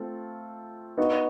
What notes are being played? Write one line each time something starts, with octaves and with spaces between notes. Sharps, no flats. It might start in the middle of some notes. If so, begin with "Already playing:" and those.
Already playing: A3 C4 F4 A4
B3 D#4 F#4